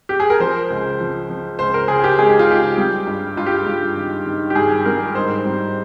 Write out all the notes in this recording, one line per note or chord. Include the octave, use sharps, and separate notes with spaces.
G4
G#4
A#4
F3 C5
C#2
F3
F3
C#2 C5
A#4
C#3 G#4
G4
G#3 G#4
G4
F4
C#2 G4
G3
G2
G2 F4
G4
F4
G2
D#3
D#3
G4
G2 G#4
G3 A#4
G#2 C5
G3